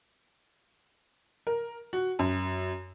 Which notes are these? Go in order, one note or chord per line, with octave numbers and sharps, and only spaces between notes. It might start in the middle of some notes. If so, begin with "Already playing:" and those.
A#4
F#4
F#2